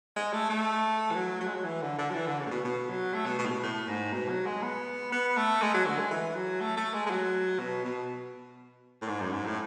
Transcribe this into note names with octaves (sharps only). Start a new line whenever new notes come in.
G#3
A3
A3
E3
F#3
F#3
G#3
F#3
E3
D3
D3
F#3
E3
D3
C#3
A2
B2
B2
F#3
A3
B2
B2
A2
B2
A2
G#2
B2
F#3
G#3
B3
B3
A3
G#3
F#3
D3
G#3
E3
F#3
A3
A3
G#3
G#3
F#3
B2
B2
A2
G#2
F#2
G#2
A2